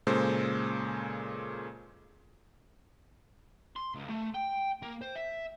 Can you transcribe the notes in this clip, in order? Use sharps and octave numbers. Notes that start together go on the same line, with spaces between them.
A#2 C#3 G#3 A4 C5
C6
C#2
A3
G5
A#3
C5
E5